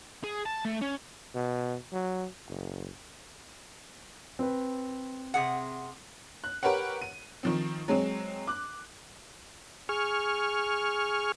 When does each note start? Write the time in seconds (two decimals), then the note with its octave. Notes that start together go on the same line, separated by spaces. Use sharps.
0.24 G#4
0.46 A5
0.65 A3
0.82 C#4
1.35 B2
1.92 F#3
2.48 F#1
4.39 C4 B4
5.34 C3 G#4 F#5
6.44 F#6
6.63 G4 A#4 B4 C#5 F#5
7.02 D#7
7.43 D#3 F3 C4
7.88 F#3 G#3 C4
8.47 D6 F#6
9.89 G#4 C#6 F6